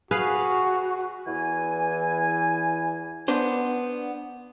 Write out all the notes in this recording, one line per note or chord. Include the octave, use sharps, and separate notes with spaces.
F#4 G#4 B4 F5
E2 E3 G#5
B3 D4 C5